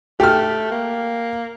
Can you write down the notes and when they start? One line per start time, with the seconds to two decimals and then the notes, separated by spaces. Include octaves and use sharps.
0.20 A3 G4 F6
0.71 A#3